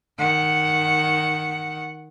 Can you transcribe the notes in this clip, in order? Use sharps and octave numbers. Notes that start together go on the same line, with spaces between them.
D#3 F#5